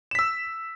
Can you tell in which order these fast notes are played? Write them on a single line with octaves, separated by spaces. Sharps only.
E7 B6 E6